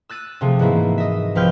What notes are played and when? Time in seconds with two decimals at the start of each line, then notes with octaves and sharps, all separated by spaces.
0.09 E6 F#6 A6 D#7
0.41 C3 F3 A3 G#4
0.59 G#2 E3 F#3 A#3 E4
0.98 D#5 E5
1.35 C2 F3 B4 G5 F6 G6